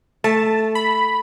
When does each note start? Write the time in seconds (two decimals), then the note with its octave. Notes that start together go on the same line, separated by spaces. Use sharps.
0.24 A3 A5
0.75 B5